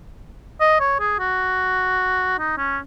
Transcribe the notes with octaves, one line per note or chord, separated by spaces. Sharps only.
D#5
C#5
G#4
F#4
D#4
C#4